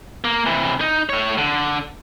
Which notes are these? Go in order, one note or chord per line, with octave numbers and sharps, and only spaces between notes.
A#3
C3 E3
D#4
A3 C#5
D3